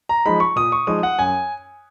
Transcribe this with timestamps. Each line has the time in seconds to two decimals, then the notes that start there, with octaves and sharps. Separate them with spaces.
0.09 A#5
0.26 F3 G#3 D#4 B5
0.40 C#6
0.56 A#2 D#6
0.72 C#6
0.87 F3 G#3 D#4 D#6
1.03 F#5
1.19 F#2 G#5